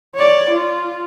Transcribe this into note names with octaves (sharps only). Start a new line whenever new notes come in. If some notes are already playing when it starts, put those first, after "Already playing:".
C#5 D5
F4